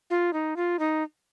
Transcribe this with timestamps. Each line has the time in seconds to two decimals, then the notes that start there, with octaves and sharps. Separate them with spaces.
0.10 F4
0.33 D#4
0.56 F4
0.79 D#4